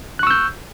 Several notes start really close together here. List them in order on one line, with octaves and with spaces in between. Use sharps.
F#6 C#6 E6 G6